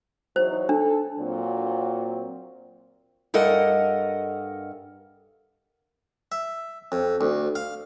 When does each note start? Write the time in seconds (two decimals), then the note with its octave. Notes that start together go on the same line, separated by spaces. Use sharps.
0.36 E2 F#3 D#4 C5
0.69 D4 A4
1.18 A#2 F#3 C4
3.34 G2 A4 A#4 D#5 F#5
6.32 E5
6.92 F2
7.21 D2
7.55 F5